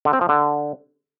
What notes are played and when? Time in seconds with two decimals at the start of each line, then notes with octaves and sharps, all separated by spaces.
0.05 D3
0.13 C4
0.21 F3
0.29 D3